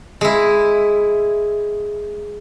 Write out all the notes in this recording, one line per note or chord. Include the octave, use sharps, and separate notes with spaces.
G#3 E4